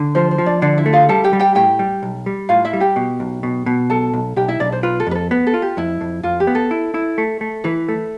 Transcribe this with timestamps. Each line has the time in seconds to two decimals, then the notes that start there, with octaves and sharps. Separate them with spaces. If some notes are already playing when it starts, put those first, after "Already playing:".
Already playing: D3
0.15 F3 C5
0.31 C5
0.38 F3
0.46 D4 D5
0.61 D3 D4 D5
0.78 E4 E5
0.86 A3
0.93 F4 F5
1.09 G3 A4 A5
1.24 G4 G5
1.33 G3
1.40 G4 G5
1.55 A2 G4 G5
1.79 G3
2.03 B1
2.26 G3
2.49 A2 F4 F5
2.65 E4 E5
2.73 G3
2.80 G4 G5
2.96 B2
3.20 B1
3.43 B2
3.66 B2
3.90 B1 A4 A5
4.14 B1
4.36 B1 G4 G5
4.48 E4 E5
4.60 B1 D4 D5
4.72 C5
4.83 F4 B4
5.00 A4
5.07 F2 B4
5.15 A4
5.31 B3 B4
5.47 A4
5.54 F4
5.62 G4
5.77 F2 E4
6.01 F2
6.23 F2 F4
6.40 G4
6.47 B3
6.55 A4
6.71 E4
6.94 E4
7.18 A3
7.41 A3
7.64 E3 B4
7.89 A3